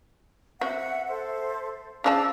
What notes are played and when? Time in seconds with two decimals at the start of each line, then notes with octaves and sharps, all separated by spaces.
0.61 C4 F#4 E5 F#5
1.08 A4 C5 E5
2.04 C#3 F3 D4 D5 A5 E6